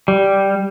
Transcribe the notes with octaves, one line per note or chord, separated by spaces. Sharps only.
G3